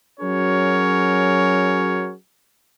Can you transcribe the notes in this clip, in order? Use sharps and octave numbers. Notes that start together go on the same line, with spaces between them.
F#3 C#4 F#4 G#4 A#4 C#5